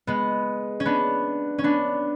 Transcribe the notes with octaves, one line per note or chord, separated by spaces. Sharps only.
G#3 B3
C#4
B3 D4
C#4
B3 D4